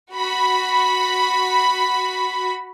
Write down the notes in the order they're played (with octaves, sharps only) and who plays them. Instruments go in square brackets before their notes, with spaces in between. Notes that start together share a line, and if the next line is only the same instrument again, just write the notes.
[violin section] F#4 B5